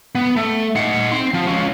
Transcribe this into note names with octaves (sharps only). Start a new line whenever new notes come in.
B3
A3
D#4 F#5
C4 C6
F3
C#4 F4